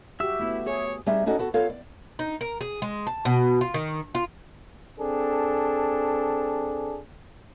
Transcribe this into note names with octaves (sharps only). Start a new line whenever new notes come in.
F#4 G4 E5 E6
A3 B3 E4
G#4 C#5
G3 C4 D#4 G#4 E5
C#4 D#4 F#4 A4 D5 D#5
B3 F#4 A4
B3 F4 A4 C#5 F5
D5
D#4
A#4
G#4
G#3
A5
B2
F4
D#3
F4
C4 D4 G#4 A4